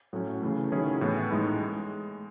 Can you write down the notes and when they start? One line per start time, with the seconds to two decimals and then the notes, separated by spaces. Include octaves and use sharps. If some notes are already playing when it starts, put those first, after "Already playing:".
0.13 A2 F#3 A3 C#4
0.42 C#3 E3 A3
0.72 D#3 F#3 C#4 E4 G#4
1.01 A2 E3 B3
1.31 A2 G#3 D#4
1.60 G#3